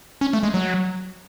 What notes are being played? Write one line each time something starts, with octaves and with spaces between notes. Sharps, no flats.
C#4
A3
G#3
F#3